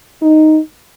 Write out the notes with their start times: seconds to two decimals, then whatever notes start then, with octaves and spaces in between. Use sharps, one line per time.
0.23 D#4